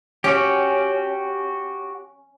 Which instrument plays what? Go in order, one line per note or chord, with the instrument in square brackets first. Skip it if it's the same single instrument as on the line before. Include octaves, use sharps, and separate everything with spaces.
[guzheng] C#4 [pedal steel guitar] F#4 G4